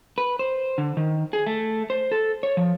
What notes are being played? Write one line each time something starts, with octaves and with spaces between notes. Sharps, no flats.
B4
C5
D3
D#3
G#4
A3
C5
A4
C#5
F3